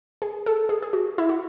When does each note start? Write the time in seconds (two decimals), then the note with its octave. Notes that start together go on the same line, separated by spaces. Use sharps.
0.22 G#4
0.46 A4
0.69 G#4
0.82 G#4
0.93 F#4
1.18 E4
1.29 F#4